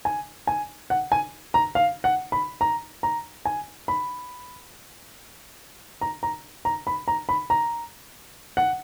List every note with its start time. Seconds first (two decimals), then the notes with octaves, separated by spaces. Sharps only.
0.05 G#5
0.47 G#5
0.90 F#5
1.12 G#5
1.54 A#5
1.75 F5
2.04 F#5
2.32 B5
2.61 A#5
3.03 A#5
3.45 G#5
3.88 B5
6.01 A#5
6.23 A#5
6.65 A#5
6.87 B5
7.08 A#5
7.29 B5
7.50 A#5
8.57 F#5